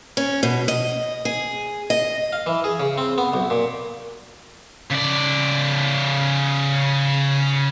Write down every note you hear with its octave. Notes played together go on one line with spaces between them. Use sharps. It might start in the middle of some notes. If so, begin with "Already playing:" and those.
C#4
B2
D#5
G#4
D#5
F5
E3
G#4
C#3
C4
B3
B1
A#2
C#3 D5